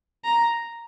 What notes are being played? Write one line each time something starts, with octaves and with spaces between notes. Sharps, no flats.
A#5